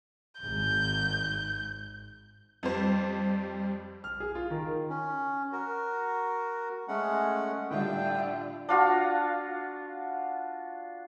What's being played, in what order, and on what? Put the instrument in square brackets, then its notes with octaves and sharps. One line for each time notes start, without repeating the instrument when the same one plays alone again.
[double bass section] G#1 G#2 [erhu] G6
[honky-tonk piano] F2 C5 [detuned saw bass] G3
[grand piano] F6
G#4
F4
D#3
[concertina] C#4
F#4 A#4
G#3 A3 C#4 F#5
[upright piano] A2 D3 G3 [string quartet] D4 F4 [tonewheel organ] E5 [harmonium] G5
[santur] D4 F4 F#4